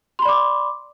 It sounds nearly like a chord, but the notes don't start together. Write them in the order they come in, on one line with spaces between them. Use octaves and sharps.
C6 B5 D5 D6